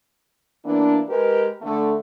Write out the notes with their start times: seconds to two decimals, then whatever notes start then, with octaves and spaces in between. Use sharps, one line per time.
0.64 E3 A#3 B3 D4
1.09 G#3 G4 A#4 B4
1.62 D3 A3